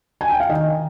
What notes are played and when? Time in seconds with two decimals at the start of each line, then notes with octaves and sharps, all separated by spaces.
0.21 G#5
0.29 G5
0.40 F5
0.49 D#3 D#5